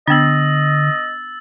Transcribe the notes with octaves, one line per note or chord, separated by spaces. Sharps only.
D3 B3 D4 D#5 E6 A6